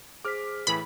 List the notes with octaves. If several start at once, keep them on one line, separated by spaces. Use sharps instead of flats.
G#4 C5 D6 F6 B6
A2 E3 G#4 B5